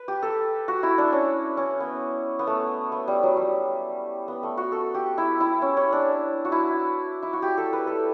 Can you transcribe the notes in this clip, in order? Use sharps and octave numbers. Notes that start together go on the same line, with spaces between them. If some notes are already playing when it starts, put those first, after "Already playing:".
Already playing: B4
G4
A4
F#4
E4
D4
C#4
C#4
B3
B3
A3
B3
G3
F#3
G3
B3
A3
F#4
A4
G4
E4
E4
C#4
C#4
D4
F#4
E4
E4
F#4
G4
A4
B4
A4